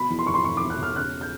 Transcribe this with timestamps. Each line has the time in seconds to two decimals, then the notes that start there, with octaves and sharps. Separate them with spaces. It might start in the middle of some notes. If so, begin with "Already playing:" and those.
Already playing: B2 B5
0.10 E2
0.19 C6
0.27 E1 C#6
0.34 C6
0.44 E1 C#6
0.57 D6
0.62 E1
0.70 F#6
0.79 E1 F6
0.95 C#3 F#6
1.21 G6